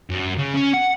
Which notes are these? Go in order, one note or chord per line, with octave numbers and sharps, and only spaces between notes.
F#2
C#3
C#4
F#5